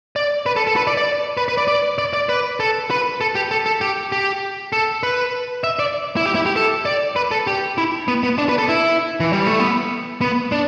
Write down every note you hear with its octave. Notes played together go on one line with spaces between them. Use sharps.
D5
B4
A4
A4
B4
D5
D5
B4
B4
D5
D5
D5
D5
B4
A4
B4
A4
G4
A4
A4
G4
G4
A4
B4
E5
D5
E4
G4
E4
G4
A4
D5
B4
A4
G4
E4
B3
B3
D4
B4
A4
E4
E3
G3
A3
B3
B3
D4